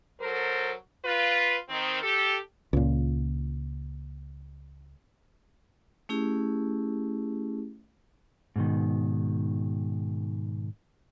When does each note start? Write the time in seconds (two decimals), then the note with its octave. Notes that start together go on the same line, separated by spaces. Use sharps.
0.21 F#3 A4 A#4 C5
1.05 F4 B4
1.69 D#3 C4
2.02 G4 A4
2.73 C#2 A#2
6.09 A3 C#4 E4 G4 G#4
8.56 G#2 B2 D#3